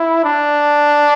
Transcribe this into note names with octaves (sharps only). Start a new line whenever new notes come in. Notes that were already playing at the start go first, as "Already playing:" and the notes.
Already playing: E4
D4